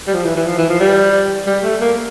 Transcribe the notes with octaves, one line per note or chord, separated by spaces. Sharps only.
G3
F3
E3
E3
F3
E3
F3
G3
G3
A3
A#3